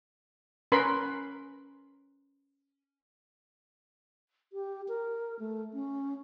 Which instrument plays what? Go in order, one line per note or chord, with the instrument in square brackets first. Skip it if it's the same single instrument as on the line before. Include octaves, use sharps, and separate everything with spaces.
[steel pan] C#4 A#4 B4 B5 C6
[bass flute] G4
A#4
A3
C#4